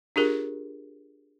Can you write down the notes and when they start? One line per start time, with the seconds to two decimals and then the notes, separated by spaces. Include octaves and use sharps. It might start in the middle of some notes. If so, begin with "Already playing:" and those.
0.16 D4 F4 G4 G#4 A#4